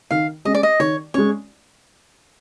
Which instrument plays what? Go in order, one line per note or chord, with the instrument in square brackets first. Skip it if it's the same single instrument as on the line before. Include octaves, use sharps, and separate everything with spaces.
[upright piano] D#3 [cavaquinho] F5
[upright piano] G#3 C#4 [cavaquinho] D#5
[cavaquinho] D5
D#5
[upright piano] D#3 [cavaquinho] C#5
[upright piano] G#3 C#4 [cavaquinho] C#5